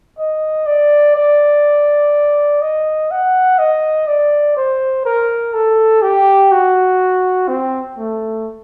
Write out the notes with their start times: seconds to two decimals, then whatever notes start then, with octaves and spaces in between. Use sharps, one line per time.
0.18 D#5
0.66 D5
1.16 D5
2.62 D#5
3.11 F#5
3.58 D#5
4.07 D5
4.56 C5
5.05 A#4
5.54 A4
6.02 G4
6.52 F#4
7.48 C4
7.98 A3